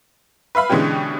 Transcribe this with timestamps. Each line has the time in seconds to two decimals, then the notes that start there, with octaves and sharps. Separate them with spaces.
0.55 B4 E5 F5 B5
0.70 B2 D3 E3 G#3 C#4 G4